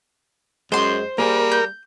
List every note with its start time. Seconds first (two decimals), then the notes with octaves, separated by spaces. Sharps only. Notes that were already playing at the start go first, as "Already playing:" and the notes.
0.72 F#2 G#3 C5 C6
1.18 G3 A#3 G#4 A#4
1.52 G6